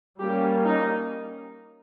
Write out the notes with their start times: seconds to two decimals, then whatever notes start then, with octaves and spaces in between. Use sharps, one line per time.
0.20 G3 A#3 C#4 G4
0.65 D#4